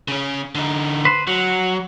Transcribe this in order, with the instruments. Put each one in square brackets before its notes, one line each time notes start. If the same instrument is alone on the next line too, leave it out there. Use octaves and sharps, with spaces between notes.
[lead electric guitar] C#3 C#4
D3 D#4
[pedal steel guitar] B4 C5
[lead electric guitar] F#3 [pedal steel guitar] F#5